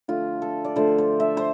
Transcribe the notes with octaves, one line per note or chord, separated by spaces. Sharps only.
D3 F3 A3 F4
A4
D5
D3 F3 A3 C5
C5
E5
C5